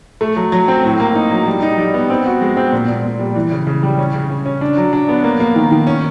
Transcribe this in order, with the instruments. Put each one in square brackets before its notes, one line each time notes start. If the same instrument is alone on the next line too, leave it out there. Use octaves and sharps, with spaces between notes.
[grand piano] A3
F#3
F#3
C4
A2
A#3
D#4
F#3
G3
D#4
G3
B3
C4
F#4
G#3
C4
A#2
A#2
A#2
G3
E3
C#3
C#3
G3
C#4
C#3
C#4
C#4
D4
F#3
D4
B3
A#3
A#3
D#3
D#3
C#4